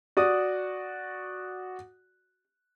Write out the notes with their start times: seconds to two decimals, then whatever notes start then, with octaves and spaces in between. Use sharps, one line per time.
0.17 F#4 D5 D#6